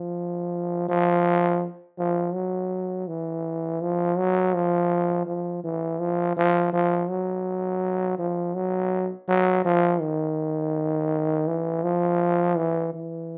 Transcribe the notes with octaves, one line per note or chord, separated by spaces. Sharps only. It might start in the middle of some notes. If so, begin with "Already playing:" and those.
Already playing: F3
F3
F3
F#3
E3
F3
F#3
F3
F3
E3
F3
F3
F3
F#3
F3
F#3
F#3
F3
D#3
E3
F3
E3
E3